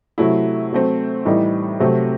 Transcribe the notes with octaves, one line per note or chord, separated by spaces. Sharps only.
C3 F#3 A3 E4
F#3 A3 C4
A2 E3 G3 D#4
C3 F#3 A3 C4